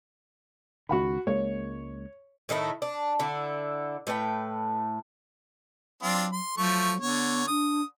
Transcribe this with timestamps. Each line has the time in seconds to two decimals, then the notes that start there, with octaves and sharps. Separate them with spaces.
0.89 C#2 D#3 F#4 F#5 B5
1.27 C#2 G#3 A#3 C#5
2.49 A2 D#3 A3 E4
2.82 D4
3.19 D3 E4
4.07 A2 A3 B4 G5
6.03 F#3 C4 D4 F4
6.32 C6
6.57 F3 F#3 A3 C#6
7.00 D3 B3 C#5
7.48 D4 D#6